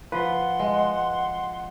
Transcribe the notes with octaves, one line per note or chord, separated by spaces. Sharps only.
F3 B4 F#5 C6
G#3